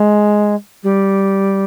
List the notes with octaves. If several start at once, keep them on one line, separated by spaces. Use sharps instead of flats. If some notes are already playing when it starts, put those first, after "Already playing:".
Already playing: G#3
G3